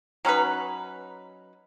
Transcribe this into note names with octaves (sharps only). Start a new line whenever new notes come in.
F#3 C#4 D#4 B4